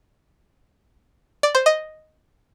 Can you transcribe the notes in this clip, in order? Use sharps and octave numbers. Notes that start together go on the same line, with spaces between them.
D5
C5
D#5